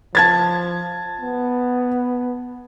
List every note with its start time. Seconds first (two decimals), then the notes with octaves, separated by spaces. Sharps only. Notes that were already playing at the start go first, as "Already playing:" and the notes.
0.15 F3 A5 G#6 A6
1.21 B3